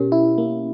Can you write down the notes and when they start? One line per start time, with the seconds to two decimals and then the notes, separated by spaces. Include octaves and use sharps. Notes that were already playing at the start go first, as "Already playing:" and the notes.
Already playing: B2 C#4 G4 A#4
0.12 E4
0.38 A#3